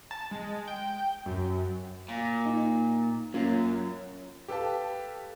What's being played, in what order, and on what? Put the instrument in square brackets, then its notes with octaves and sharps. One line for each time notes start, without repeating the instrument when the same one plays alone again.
[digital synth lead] A5
G#3
G5
F#2
[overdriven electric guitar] A#2
[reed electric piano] D#4
[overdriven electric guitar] F#2 [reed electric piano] A#3 C#4 F4
[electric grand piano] G4 A4 B4 F5 A5